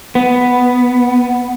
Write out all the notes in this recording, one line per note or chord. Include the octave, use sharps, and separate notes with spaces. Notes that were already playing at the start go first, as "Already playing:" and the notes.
B3